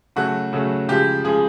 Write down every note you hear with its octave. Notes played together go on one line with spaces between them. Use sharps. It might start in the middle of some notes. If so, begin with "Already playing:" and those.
C#3 F#3 A3 F#4
C#3 F#3 A3
C#3 F3 G#3 G4
C#3 F3 G#3 G#4